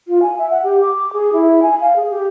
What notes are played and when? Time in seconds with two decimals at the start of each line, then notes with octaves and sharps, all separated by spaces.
0.08 F4
0.22 G#5
0.38 E5
0.51 F#5
0.63 G4
0.81 D6
1.13 G#4
1.33 E4
1.62 G#5
1.81 F5
1.96 G#4
2.10 G4